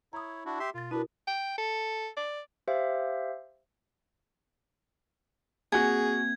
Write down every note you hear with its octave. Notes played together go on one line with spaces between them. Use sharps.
E4 C#5 A#5 D#6
D4 E4 F#4
G4 E5 C6
B2 F4 A6
D4 E4 F#4 A#4 B4
G5
A4
D5
G4 C5 E5 F5
A#3 C4 F#4 G#4 F#5 G#5 G#6